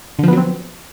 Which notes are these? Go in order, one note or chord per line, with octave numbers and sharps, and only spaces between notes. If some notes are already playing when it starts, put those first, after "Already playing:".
D3 F3 F#3 B3 C4